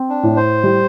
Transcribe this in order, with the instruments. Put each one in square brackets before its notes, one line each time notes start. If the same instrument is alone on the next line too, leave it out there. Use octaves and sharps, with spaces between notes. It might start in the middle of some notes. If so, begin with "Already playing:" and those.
Already playing: [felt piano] C4
[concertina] D4
[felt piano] A2
[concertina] C5
[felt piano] G3